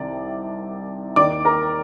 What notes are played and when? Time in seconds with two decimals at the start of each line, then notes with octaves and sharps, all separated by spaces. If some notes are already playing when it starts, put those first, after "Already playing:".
Already playing: C2 C3 D#3 D5
1.16 D#2 D#3 D5 D6
1.45 A#4 A#5